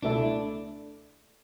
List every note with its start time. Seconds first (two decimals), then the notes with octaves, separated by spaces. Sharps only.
0.02 C#2 B2 A3 D4 E4 A4